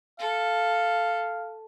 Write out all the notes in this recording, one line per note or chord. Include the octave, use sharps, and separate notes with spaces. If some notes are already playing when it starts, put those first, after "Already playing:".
A4 F5